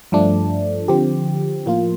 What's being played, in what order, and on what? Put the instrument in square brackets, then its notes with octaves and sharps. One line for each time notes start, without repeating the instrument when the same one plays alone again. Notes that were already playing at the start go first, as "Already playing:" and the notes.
[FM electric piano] G2 F3 A3 D4
D3 F3 C4 G4
A2 F3 A#3 F4